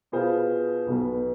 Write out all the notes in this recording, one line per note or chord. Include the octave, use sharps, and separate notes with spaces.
B2 B3 F4 G#4 C5
B1 B2 B3